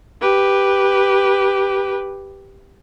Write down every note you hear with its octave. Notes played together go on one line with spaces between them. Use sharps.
G4 B4